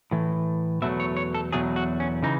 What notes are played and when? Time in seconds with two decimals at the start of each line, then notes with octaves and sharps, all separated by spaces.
0.11 A2 E3 A3
0.82 E2 B2 F#3 A3 E5
1.00 C#5
1.17 C#5
1.35 A4
1.52 E2 B2 F#3 A3 G#4
1.76 F#4
2.00 C#4
2.23 C#3 E3 D#4